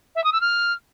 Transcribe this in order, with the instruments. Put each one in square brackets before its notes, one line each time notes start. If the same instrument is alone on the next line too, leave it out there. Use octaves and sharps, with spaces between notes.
[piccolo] E5
D#6
E6
F6